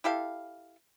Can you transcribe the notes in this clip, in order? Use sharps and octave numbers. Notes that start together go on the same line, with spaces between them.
E4 G4 A4 F5